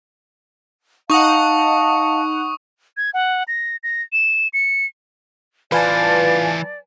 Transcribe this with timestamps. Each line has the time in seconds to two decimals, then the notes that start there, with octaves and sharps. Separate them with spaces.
1.10 D#4 D#5 F5 F#5 A5 C#6 D#6
2.97 G#6
3.14 F#5
3.48 A#6
3.83 A#6
4.13 E7
4.53 C#7
5.72 E3 F4 B4 C5 D5 F5 G#5 A5